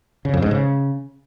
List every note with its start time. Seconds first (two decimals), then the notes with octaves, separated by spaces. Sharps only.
0.25 C#3
0.34 F2
0.42 G#2
0.51 C#3